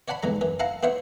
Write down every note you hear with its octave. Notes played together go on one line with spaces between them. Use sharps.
C#5 D5 F#5 A5 B5
B1 G#2 E3 G#3 A#5
F#2 E3
E4 F5 F#5 A5 A#5
B3 E4 C5 C#5 E5 F#5